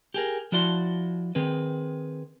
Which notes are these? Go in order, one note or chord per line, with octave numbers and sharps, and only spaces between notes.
G4 G#4 A#4
F3 E4 F#4 D5 C6
D#3 C4 G#4 B4